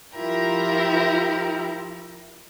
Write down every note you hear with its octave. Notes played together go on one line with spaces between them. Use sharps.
F3 E4 F4 G4 A#4